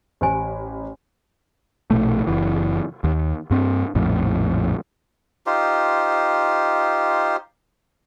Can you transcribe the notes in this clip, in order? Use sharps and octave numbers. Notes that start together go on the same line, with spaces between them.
A1 G4 C5 G#5
A#1 B2 A3
F#1 E3
D#2
G2 C4
A#1 F2 A2
D#4 F4 G4 C5